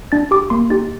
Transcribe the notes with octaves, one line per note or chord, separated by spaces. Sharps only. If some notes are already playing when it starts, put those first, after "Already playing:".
D4 A6
G4 D6
A#3 C6
D#4 G4 A6